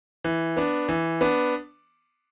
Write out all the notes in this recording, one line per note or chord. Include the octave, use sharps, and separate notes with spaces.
E3
B3 D4
E3
B3 D4